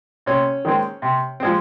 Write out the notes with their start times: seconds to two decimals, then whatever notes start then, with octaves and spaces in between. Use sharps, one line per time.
0.26 C3 C#4
0.65 D#3 G#3 C4
1.02 C3
1.40 F3 G#3 C4